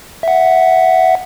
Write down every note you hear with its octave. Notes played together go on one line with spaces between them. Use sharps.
E5 F#5